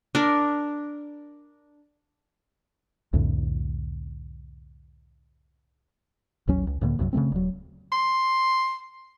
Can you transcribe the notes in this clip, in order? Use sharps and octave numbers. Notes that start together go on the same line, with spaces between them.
D4 A#4
C2 F2 A2 D3
A1 D#2 F#3 C#4
C#2
C#2 A2 D3 A#3
B1 F#2 C3 F#3
C#3 E3 A3 C4
D#1 F#3
C6